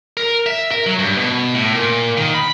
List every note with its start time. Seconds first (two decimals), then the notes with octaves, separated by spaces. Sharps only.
0.17 A#4
0.46 E5
0.71 A#4
0.86 F#3
0.99 G2
1.17 B2
1.55 A2
1.73 A#2
2.17 D#3
2.34 B5